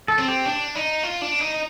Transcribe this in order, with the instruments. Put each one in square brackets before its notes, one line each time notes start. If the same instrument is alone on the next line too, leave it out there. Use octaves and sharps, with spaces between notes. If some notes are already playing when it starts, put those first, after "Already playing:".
[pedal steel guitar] A4
[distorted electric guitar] C4
[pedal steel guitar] G4
[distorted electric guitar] D4
D#4
F4
D4
D#4